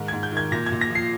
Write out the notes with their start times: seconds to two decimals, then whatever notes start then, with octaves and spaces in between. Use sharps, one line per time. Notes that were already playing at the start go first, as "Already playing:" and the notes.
Already playing: G#2 D#3
0.08 G#6
0.13 G#2
0.23 G6
0.32 D#3 G#6
0.52 A#2 A#6
0.66 G#6
0.72 A#2
0.81 A#6
0.90 F3 C7